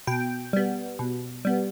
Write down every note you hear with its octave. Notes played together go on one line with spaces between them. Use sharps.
B2 G5
G3 B3
B2
G3 B3